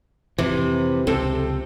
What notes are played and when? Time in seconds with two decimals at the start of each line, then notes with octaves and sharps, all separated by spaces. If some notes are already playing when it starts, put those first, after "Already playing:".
0.39 F2 C3 E3
1.07 C#2 C3 C4 A4